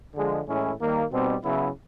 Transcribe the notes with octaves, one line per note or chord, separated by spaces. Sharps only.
D3 F3 G#3
A2 E3 G#3 C#4 E4
D#3 G3 A#3
B2 G3 C4 D#4
C#3 F#3 B3 E4